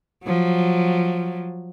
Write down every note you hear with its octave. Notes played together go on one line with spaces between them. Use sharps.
F3 F#3